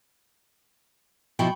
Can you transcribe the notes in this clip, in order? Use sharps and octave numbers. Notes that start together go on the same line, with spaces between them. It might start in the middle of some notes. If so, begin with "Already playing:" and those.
B2 F3 E4 G5 B5 C#6